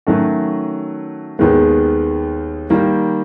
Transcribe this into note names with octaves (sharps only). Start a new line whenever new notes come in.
D#3 F#3 A3 C#4 F#4
D#2 D#3 G#3 B3
D#3 G3 A#3